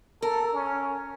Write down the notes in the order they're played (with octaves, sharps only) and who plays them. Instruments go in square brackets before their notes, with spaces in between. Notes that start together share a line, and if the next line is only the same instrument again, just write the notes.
[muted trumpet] A4 [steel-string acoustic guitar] A#4
[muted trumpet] C#4